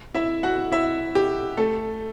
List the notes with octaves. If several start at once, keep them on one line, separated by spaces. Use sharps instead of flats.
E4 E5
F#4 F#5
E4 E5
G4
A3 A4